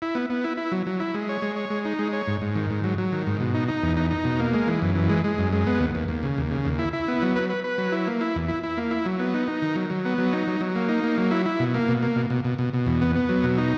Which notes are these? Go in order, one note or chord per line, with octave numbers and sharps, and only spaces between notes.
E4
B3
B3
E4
E4
F#3
F#3
E4
G#3
C#5
G#3
C#5
G#3
D#4
G#3
C#5
G#2
G#2
D#3
G#2
F#3
F#3
D#3
G#2
B2
D#4
D#4
E2
D#4
D#4
B2
A#3
G#3
E3
F#2
E3
G#3
G#3
F#2
G#3
B3
D#2
D#2
D#2
C#3
D#2
C#3
D#2
E4
E4
B3
F#3
B4
B4
B4
F#3
E4
A#3
E4
E2
E4
E4
A#3
E4
F#3
B3
D#4
D#4
D#3
F#3
F#3
B3
F#3
D#4
F#3
F#3
A#3
D#4
A#3
F#3
E4
E4
B2
A#3
B2
A#3
B2
B2
B2
B2
B2
E2
B3
B3
F#3
B2
D#4